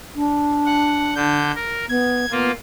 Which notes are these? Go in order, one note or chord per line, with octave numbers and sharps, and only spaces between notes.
D4
F#5
D3 G6
A#4
B3 G#6
A#3 B3 F4